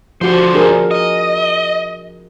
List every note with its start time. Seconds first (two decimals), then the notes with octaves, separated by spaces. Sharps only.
0.21 D3 F3 F#4 C5
0.54 D4 G#4 A#4
0.91 D#5